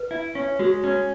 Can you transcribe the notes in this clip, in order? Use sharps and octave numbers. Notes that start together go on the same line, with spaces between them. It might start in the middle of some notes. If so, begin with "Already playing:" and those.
Already playing: B4
E4
C#4
G#3 F#4
C#4